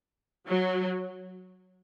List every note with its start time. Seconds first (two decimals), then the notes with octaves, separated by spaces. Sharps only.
0.48 F#3